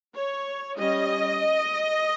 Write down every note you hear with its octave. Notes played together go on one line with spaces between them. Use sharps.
C#5
G3 C#4 D#5